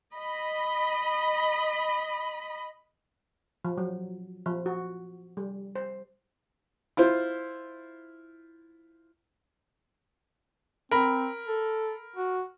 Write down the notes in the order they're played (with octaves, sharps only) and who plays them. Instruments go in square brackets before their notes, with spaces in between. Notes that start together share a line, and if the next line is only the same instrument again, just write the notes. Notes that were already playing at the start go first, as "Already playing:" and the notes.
[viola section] D#5 B5
[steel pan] F3
F#3
F3
F#4
G3
C5
[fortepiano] E4 F4 C5
[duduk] C4 [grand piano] A#4 B5
[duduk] A4
F#4